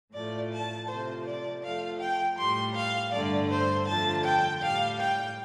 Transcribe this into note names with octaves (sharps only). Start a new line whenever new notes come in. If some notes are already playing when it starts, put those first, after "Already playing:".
A2 F3 A3 D5
A5
C3 F3 A3 C5
D5
F2 F3 A3 F5
G5
A2 G3 C6
F5
G2 D3 A3 D5
C5
F2 D3 F3 A3 A5
G5
A2 G3 F5
G5